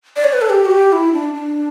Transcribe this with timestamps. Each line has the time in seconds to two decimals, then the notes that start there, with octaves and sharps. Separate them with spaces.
0.16 D5
0.24 C#5
0.33 B4
0.41 A4
0.50 G4
0.65 F#4
0.71 G4
0.92 E4
1.13 D4
1.34 D4